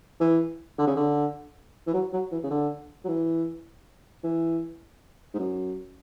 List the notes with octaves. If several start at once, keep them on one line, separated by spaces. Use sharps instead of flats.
E3
D3
C#3
D3
E3
F#3
F#3
E3
C#3
D3
F#3
E3
E3
G#2
F#2